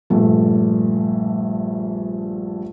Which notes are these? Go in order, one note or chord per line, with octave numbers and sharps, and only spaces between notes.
A#1 G2 A3